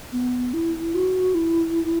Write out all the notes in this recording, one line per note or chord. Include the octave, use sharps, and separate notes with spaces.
B3
E4
F#4
E4